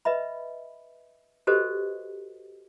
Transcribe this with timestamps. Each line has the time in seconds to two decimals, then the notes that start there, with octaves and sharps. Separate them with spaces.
0.05 B4 D#5 E5 B5
1.47 F#4 G4 A4 B4 C5 D#5